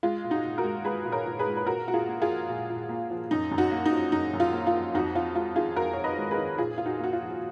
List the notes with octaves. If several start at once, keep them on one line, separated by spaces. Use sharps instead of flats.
G#3 F4
A#2
D#4 F#4
A#2
F#4 A#4
G#3
G#3 G#4 B4
A#2
A#4 C#5
A#2
G#4 B4
G#3
B4
A#2 F#4 A#4
A#2 F#4
F4 G#4
A#3
F4 G#4
F3
A#2
A#2
A#3
F3
F#2 D#4
F#2
D#4 F#4
A#3
D#4
F3
F#2 D#4
F#2
F4
A#3
F4
F3
F2 D#4 F#4
F2 F4
G#3 F4
D#3 F4 G#4
F2 F#4 A#4
F2 C#5
B4 D#5
G#3
G#4 B4
D#3
A#2 F4 G#4
A#2 F4
D#4 F#4
A#3 F#4
F4
F3